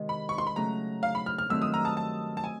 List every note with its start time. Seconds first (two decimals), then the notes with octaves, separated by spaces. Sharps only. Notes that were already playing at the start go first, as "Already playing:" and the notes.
Already playing: C3 D#3 G#3
0.09 B5
0.29 C#6
0.38 C6
0.47 B5
0.56 C#3 F#3 A3 C#4 A#5
1.03 F5
1.15 B5
1.26 F6
1.38 F6
1.49 G2 D#3 F#3 A3 C4 E6
1.62 D#6
1.74 A#5
1.85 A5
1.97 A5
2.37 A5
2.44 G#5